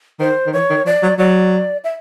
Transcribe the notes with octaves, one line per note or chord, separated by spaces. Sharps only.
D#3 C5
D#3
E3 C#5
D#3
F3 D5
F#3
F#3 D5
E5